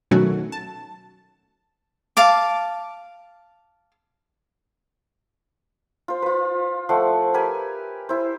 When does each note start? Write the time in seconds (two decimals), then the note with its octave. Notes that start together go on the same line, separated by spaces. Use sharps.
0.11 B2 D#3 F#3 A3 C#4 F#4
0.52 A5
2.17 F5 A5 D6
6.08 F4 C5
6.22 F4 B4
6.89 F3 A3 F#5 C6
7.34 G4 A#4 B4 G#5
8.09 E4 C5